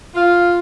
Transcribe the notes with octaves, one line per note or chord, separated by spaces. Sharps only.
F4